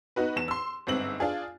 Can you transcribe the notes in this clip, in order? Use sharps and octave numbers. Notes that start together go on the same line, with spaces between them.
B3 D#4 F#4 B4
E2 E7
C6 E6
G1 G#2 C4 F#7
D4 F4 G#4